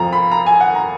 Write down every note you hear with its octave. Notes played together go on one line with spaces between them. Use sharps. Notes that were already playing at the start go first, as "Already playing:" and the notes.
Already playing: F2 F3 A#5
B5
A#5
G#5
F#5
A#5